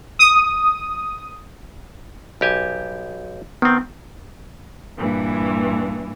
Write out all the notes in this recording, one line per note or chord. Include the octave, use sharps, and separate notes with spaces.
D#6
B1 G4 G#5
D#3 B3 C4
G2 A#2 E3